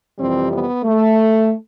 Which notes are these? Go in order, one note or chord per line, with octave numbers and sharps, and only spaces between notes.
F2 C3 E3 G3 C4
B3
A3